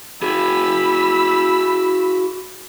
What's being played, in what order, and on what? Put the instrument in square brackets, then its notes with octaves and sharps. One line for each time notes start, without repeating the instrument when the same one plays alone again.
[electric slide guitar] F#4 G#4 [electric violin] B5 E6